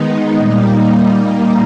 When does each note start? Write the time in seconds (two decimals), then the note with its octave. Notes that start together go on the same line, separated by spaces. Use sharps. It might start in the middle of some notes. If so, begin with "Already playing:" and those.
Already playing: D#3 G#3 B3 D#4
0.37 A#2 G3 A#3 D#4